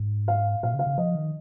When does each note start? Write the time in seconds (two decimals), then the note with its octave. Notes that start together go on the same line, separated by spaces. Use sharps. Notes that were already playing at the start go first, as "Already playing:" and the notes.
Already playing: G#2
0.28 F5
0.63 A#2 F5
0.74 C#3
0.79 F5
0.87 C#3
0.98 F3 D#5
1.15 D#3